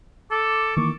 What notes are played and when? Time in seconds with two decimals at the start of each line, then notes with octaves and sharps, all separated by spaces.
0.31 A4 D6
0.77 D#3 E3 A#3 C#6